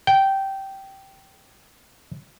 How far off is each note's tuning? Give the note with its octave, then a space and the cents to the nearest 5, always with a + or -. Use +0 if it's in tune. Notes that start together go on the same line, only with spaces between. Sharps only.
G5 -10